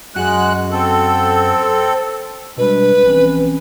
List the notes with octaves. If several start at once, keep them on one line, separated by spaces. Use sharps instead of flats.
F#2 G#3 F#4 F#6
C4 A4
B2 G3 G#3 D4 B4
A#1 E3 C4 C#4